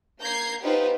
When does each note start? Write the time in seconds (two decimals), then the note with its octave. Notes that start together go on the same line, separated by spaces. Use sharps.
0.21 A#3 A#5 G6 G#6 C7
0.62 B3 D#4 F4 G4 B4 C5